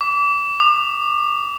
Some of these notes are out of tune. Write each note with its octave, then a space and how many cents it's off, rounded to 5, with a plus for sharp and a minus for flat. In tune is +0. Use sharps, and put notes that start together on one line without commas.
D6 -30
D6 +40